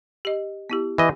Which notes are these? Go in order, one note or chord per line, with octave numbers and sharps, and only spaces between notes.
G4 D#5
B3 E4 G4
E3 D#5